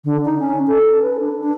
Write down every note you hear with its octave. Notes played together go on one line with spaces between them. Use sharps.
D3
D#4
C#4
A4
B4
D4
D4